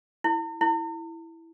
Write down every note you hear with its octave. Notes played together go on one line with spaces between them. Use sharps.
E4
E4